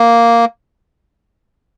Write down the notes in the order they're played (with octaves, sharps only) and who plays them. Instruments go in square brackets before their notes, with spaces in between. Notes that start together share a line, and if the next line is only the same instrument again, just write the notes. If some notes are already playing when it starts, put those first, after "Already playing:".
Already playing: [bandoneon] A#3